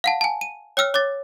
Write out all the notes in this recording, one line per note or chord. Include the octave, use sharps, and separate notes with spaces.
F5 F#5 A5
G#5 A5
D#7
C#5 G5 E6 F6
C#5 D6 A6